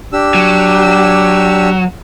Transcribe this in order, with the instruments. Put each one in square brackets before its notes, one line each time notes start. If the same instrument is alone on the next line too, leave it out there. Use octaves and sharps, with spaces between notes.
[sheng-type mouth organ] D4 G4 E6
[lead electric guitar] F#3